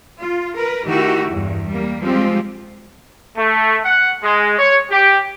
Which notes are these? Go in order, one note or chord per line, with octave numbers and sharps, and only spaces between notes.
F4
A#4 B4
D#3 A3 E4 F#4 G4
E2 G2
G3 A#3
F3 G3 G#3 C4 F4 G4
A3
F#5
G#3
C#5
G4